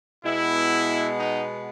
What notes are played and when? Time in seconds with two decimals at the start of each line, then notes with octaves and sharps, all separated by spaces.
0.23 B2 G#3 B3 E4
1.18 D#4